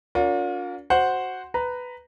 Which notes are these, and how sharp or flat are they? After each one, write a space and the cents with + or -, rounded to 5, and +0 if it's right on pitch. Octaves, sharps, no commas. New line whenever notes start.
D4 -45 F4 +40 A#4 +0
F#4 +0 C5 +0 F#5 +0
B4 +10 A#5 +0